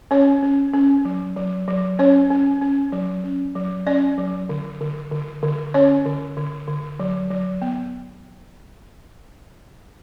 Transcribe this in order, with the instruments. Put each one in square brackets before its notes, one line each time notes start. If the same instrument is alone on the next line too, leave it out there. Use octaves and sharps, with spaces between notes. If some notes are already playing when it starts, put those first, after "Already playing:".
[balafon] C#4 C#5
C#4
C#4
F#3
F#3
F#3
C#4 C#5
C#4
C#4
F#3
C#4
F#3
C#4 D5
F#3
D3
D3
D3
D3
C#4 C#5
D3
D3
D3
F#3
F#3
B3